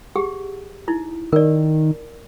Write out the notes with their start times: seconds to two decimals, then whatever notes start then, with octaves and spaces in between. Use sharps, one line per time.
0.16 G4 G#4 F#5
0.88 D#4 E4
1.32 D#3 A#4 D5